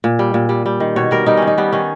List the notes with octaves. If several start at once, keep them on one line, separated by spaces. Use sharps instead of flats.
A#2
G3
A#2
G3
G3
D#3
B2 C#5
G3 A#4
G3 D#4
D#3 C#4
D#4
G3 B3
D#3 C#4